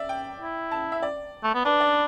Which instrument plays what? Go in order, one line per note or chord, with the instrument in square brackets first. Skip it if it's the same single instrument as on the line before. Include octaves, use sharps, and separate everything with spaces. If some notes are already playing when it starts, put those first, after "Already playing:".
Already playing: [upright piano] D5 E5
G5
[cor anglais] E4
[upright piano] A5
E5
D5
[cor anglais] A3
B3
[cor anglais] D4 [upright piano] B4
[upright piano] D5